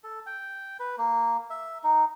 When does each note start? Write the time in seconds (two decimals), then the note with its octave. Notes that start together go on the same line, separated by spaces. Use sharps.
0.04 A4
0.26 G5
0.80 B4
0.98 A#3
1.50 E5
1.84 D#4